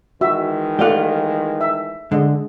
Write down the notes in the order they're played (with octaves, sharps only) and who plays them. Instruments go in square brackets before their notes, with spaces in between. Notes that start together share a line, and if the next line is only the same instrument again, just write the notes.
[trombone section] D#3 E3 G#3 [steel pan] F#4 E5
[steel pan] A3 D5 F#5 [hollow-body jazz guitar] F4 G4
[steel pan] E5
[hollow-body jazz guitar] D3 [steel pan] G#3 D#5